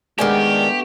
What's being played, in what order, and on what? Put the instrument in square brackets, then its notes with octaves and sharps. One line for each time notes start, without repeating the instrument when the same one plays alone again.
[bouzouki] D#3 D5 G#5 [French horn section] G#3 [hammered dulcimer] A3 B3 D4 [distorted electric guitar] G4